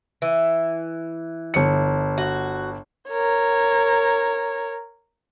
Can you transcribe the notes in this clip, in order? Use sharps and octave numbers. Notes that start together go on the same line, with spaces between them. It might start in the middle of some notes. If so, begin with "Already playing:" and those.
E3
G1 C#7
F#4
A#4 C#5